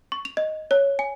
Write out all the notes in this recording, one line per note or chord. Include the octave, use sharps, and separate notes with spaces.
C#6
F7
D#5
C#5
G#5